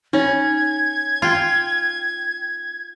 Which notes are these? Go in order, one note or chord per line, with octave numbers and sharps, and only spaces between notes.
C#4 D#4 C#5 G#6
F4 G5